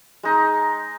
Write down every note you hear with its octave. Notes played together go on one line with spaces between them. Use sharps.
G#3 D#4